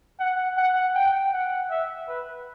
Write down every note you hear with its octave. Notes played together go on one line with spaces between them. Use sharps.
F#5
F#5
G5
F#5
E5
B4